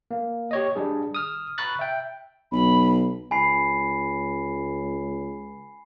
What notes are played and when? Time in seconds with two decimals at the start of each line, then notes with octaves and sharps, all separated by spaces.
0.11 A#3
0.51 G4 C#5 D#5
0.75 G3 D4 G#4
1.15 D#6 F6
1.58 A#5 B5 C#6 F#6 A6
1.79 E5 G5
2.52 B1 B5
3.31 C#2 G#5 B5 C7